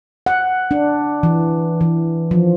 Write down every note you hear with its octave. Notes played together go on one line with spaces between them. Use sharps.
F#5
D4
E3
E3
F3